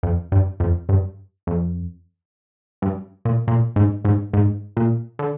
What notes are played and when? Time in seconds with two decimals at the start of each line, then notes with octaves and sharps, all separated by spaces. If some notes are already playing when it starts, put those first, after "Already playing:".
0.03 F2
0.32 G2
0.60 F2
0.89 G2
1.47 F2
2.82 G2
3.25 A#2
3.48 A#2
3.76 G#2
4.05 G#2
4.33 G#2
4.77 A#2
5.19 D3